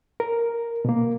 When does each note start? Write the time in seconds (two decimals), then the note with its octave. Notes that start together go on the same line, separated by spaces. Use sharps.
0.20 A#4
0.85 B2 A#3